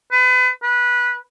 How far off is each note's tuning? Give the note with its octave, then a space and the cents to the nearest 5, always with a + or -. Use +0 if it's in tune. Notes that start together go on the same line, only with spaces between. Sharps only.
B4 +35
B4 -15